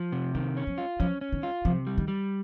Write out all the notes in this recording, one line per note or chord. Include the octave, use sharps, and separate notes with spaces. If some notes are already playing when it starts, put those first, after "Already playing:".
Already playing: F3
C3
D#3 F3
C#4
F3
F4
F3 C#4
C#4
D#3
F4
C3 F3
G3
D#3
G3